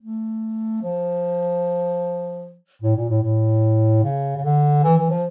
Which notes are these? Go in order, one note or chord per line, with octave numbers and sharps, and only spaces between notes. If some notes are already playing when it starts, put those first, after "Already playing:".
A3
F3
A2
A#2
A2
A2
C#3
C#3
D3
E3
E3
F3